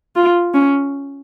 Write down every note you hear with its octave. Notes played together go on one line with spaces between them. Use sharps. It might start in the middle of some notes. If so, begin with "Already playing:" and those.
F4
C#4